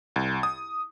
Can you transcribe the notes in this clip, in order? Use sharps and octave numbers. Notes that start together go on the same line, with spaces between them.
C2
D#6